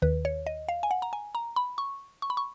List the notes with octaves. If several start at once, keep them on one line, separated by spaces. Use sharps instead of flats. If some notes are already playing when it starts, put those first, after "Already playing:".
D#2 D#3 B4
C#5
D#5
F5
G#5
F#5
A#5
G#5
A#5
B5
C#6
C#6
B5
C#6